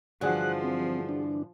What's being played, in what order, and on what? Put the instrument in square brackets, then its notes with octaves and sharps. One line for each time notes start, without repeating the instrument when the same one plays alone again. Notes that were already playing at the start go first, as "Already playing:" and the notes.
[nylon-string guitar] G2 D3 E3 [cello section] F3 [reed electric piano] F#4 G#4 F#5 [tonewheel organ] F#6
[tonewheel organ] C4
D4